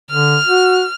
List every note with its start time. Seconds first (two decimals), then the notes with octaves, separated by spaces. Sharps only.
0.11 D3 F6
0.46 F#4